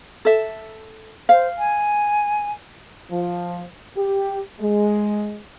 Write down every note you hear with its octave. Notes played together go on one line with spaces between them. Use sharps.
A4 E5
C5 F5
G#5
F3
G4
G#3